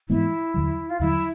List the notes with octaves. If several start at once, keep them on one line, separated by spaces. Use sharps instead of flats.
G#2 E3 G#3 B3 E4
D#2 D3 F#3
F4
D#2 D3 F#3 E4